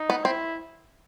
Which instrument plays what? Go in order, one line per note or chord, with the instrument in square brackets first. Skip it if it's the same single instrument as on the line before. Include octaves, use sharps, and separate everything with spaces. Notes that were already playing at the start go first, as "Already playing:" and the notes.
Already playing: [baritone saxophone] D#4
[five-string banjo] B3
[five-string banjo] C4 [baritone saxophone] E4